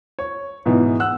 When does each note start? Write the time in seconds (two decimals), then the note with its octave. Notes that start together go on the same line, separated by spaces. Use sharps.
0.19 C#5
0.66 G#2 B2 E3
1.00 F#5 E6 F#6